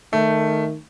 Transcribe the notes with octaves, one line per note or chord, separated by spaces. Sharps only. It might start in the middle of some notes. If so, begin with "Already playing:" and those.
D#3 A3